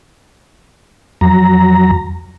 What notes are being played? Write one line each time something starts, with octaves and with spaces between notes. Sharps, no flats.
F2 F#3 A#5